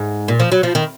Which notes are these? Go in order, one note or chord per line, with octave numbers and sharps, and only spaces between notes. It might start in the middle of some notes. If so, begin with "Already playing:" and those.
Already playing: G#2
A#2
F3
F#3
F3
D#3